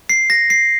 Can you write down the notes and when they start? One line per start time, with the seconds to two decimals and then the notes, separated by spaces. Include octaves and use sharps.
0.09 C7
0.30 A#6
0.50 C7